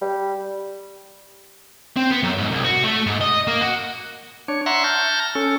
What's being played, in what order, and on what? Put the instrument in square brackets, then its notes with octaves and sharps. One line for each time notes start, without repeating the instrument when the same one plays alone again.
[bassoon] G3
[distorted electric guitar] C4
B3
F#2
G#2
C2
F#4
A3
G#2
D#5
A#3
F#4
[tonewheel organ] D4 C#5
E5 F#5 A#5 C6 C#6
A5 F6 G6 A#6
C#4 A4